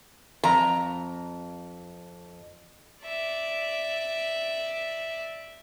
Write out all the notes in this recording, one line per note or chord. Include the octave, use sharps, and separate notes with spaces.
F2 A#5
D5 E5